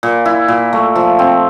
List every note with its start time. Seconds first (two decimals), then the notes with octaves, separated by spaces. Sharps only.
0.03 A#2
0.25 E4
0.48 A#2
0.73 A3
0.96 F3
1.19 C4